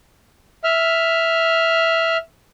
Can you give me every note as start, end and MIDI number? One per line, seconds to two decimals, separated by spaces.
0.64 2.17 76
0.64 2.17 89